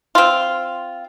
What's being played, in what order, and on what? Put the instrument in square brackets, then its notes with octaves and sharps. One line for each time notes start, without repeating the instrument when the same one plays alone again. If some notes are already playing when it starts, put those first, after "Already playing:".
[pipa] C4 F4